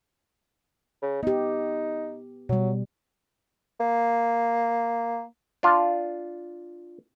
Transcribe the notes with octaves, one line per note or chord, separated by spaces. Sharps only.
C#3
B3 D#4 G4
B2 F#3 G3
A#3
D4 F4